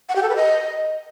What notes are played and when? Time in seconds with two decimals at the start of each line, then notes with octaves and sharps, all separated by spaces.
0.09 F#5
0.16 G4
0.22 A4
0.29 B4
0.36 D#5